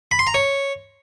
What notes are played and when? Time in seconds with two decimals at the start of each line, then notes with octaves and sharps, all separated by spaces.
0.11 B5
0.19 C6
0.27 A#5
0.34 C#5